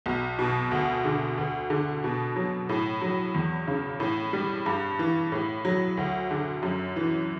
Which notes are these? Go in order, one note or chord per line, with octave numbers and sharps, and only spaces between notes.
B1
B2
D2
D3
D2
D3
B2
F#3
A2
F#3
E2
C#3
A2
G3
G2
E3
A2
F#3
D2
D3
F#2
E3